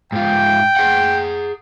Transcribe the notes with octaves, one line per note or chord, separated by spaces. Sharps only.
G#2 F4 G5
G#4 F#5